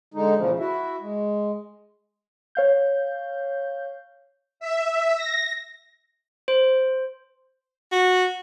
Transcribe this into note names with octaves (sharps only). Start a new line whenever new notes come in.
D3 G#3 D#4
E2 A#2 C#3 F3
E4 F#4 E5
G#3
C#5 F5 G6
E5
A#6
C5
F#4